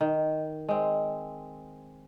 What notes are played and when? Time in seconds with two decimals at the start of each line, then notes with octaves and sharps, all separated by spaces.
0.01 D#3
0.69 G#3 C4